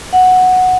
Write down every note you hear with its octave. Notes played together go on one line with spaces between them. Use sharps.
F#5